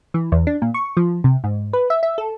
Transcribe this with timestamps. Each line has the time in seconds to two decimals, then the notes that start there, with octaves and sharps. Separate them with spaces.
0.14 E3
0.32 E2
0.47 D4
0.62 A#2
0.74 C#6
0.97 F3
1.24 C3
1.44 G#2
1.73 B4
1.90 E5
2.03 E5
2.18 A4